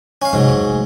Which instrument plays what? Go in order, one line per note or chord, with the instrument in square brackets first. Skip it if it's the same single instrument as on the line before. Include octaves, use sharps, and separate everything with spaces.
[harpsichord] C#4 F5
[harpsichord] G#2 F#3 [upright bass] C3
[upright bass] F2
A3